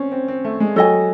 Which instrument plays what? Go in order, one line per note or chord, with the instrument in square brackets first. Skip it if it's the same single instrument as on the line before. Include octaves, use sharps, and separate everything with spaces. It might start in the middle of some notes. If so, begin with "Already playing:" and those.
Already playing: [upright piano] C4 C#4
C4
C4
A3
G#3
[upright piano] F#3 [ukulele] A4 D#5 G#5